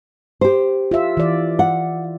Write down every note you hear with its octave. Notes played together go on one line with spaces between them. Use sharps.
G4 C5
F4 E5
E3 D5
F#5